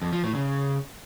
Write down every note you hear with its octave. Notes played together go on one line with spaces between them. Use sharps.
F2
F3
A2
C#3